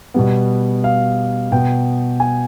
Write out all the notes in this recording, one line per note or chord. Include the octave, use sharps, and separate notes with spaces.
B2 G3 B3
F5
B2 B3 G5
G#5